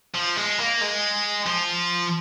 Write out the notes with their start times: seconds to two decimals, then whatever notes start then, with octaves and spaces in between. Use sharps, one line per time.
0.15 F3
0.37 G#3
0.58 A#3
0.81 G#3
1.47 F3